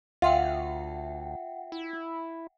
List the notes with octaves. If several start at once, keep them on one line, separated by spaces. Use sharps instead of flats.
D2 F4 E5 F#5 G5
E4